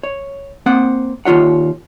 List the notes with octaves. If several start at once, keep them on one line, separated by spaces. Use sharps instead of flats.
C#5
A#3 C4 F#5
D#2 C3 F4 C#5 F#5